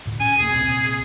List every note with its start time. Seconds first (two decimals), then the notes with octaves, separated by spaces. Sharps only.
0.06 D2 A2 D3
0.20 C#4 G#5
0.38 E1 A#3 G#4
0.51 C2 A#2 C4